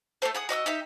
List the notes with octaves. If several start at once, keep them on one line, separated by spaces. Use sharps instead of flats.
A3 G4 A4 C5
G#4 F#5 D#6
F#4 D#5 D6 E6
D#4 G4 E5